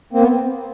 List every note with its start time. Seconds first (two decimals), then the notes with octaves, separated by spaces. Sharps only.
0.13 A#3 C4
0.21 B3